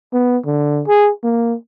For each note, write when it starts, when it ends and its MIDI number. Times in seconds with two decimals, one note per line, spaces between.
0.13 0.37 59
0.46 0.82 50
0.88 1.10 68
1.23 1.54 58